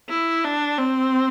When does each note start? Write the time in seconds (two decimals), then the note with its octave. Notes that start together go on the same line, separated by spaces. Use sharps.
0.09 E4
0.44 D4
0.78 C4